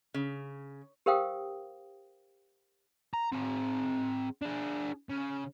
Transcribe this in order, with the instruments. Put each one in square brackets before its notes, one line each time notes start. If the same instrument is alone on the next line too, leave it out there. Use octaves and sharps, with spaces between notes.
[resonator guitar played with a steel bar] C#3
[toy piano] G4 A#4 C5 F5 G5 D#6
[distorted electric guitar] A#5
C4 G#4
D4 G#4
C#3